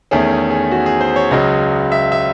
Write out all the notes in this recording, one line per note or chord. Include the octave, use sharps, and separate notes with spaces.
E2 D#3 A3 C#4 G#4
G#4
G#4
F#4
G#4
C5
C#5
C#2 C#3 F#3 D#5
E5
E5